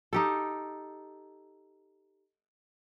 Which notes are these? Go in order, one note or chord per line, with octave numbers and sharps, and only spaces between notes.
D#4 G4 A4